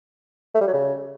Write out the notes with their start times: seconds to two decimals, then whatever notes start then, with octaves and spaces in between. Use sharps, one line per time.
0.55 A3
0.61 G3
0.67 F#3
0.73 C#3